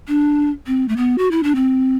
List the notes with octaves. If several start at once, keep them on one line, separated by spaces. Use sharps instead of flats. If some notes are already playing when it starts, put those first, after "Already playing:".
D4
C4
A3
B3
F#4
E4
D4
C4